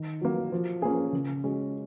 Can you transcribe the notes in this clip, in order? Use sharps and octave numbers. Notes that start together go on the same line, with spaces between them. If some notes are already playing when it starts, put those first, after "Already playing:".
Already playing: D#3
F#3 A#3
F3
A#3 C#4 G#4
C#3
G#3 C#4 F#4